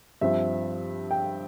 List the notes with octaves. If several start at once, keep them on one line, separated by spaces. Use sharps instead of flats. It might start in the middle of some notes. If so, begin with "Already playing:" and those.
G2 F3 C4 E5
G5